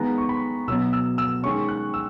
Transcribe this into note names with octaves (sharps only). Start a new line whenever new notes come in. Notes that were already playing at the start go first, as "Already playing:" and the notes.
Already playing: D#3 G#3 B3 A#5
C#6
B5
B2 F#3 B3 E6
E6
E6
D#3 G#3 C#4 C#6
F#6
E6